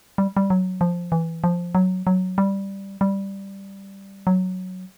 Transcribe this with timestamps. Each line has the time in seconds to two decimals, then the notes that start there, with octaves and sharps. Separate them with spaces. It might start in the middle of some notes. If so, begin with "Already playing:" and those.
0.18 G3
0.37 G3
0.50 F#3
0.81 F3
1.12 E3
1.44 F3
1.75 F#3
2.07 F#3
2.38 G3
3.01 G3
4.27 F#3